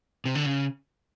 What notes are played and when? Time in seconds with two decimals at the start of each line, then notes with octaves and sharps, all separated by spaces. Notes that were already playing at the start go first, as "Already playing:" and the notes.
0.25 C3
0.35 D3
0.46 C#3